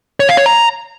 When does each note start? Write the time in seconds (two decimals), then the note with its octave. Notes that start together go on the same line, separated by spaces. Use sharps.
0.20 C#5
0.29 F5
0.37 C#5
0.46 A#5